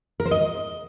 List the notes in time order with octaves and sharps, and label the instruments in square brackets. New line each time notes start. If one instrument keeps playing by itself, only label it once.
[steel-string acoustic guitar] A#4
C5
D#5